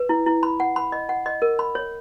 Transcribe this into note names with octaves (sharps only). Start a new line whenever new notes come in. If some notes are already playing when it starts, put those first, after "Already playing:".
Already playing: B4
E4
E4
B5
F#5
B5
D#5
F#5
D#5
A#4
B5
C#5